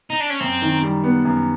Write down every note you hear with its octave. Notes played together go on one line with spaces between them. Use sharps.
D#4
D4
C#4
F#2 C4
D#3
G3
B3
F#2